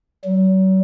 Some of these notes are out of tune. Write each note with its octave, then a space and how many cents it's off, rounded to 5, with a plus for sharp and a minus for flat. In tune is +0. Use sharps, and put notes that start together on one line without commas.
F#3 +40